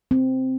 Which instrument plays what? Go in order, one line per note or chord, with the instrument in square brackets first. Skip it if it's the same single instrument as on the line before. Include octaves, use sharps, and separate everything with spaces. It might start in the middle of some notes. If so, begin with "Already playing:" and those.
[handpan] C4